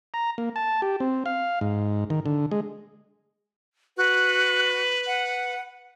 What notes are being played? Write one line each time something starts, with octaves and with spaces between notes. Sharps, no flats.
A#5
A#3
A5
G4
C4
F5
G#2
D#3
D3
G#3
F#4 B4
F#5